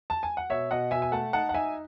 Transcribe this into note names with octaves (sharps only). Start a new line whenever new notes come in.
A5
G#5
F#5
B2 C#5 E5
B2 D#5 F#5
B2 E5 G#5
G#5
A3 F#5 A5
D#4 F#5 A5
F#5
D#4 E5 G#5